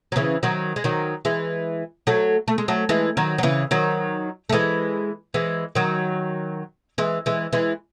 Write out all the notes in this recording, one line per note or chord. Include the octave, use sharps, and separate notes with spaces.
F#3
C#3 E3
D#3 F#3
G#3
D#3 F#3
E3 G#3
F#3 A3
A3
G#3
F#3 A3
E3 G#3
D#3 F#3
F#3
C#3 E3
D#3 F#3
A3
E3 G#3
E3 G#3
D#3 F#3
E3 G#3
E3 G#3
E3 G#3